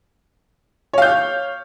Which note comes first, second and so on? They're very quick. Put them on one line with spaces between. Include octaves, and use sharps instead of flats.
C#5 F5 G6